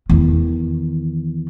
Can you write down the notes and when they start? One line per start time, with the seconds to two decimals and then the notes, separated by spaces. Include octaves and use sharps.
0.09 E2 D#3